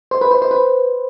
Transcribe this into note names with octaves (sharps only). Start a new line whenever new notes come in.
C5
B4
C5
C5
B4